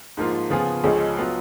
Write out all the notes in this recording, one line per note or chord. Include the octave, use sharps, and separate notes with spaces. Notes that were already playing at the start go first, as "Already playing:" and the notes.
G#2 F3 A#3 F4
C#3 F3 B3 F4 G#4
C#2 C#3 F3 G#3 C#4
F#3 B3 F4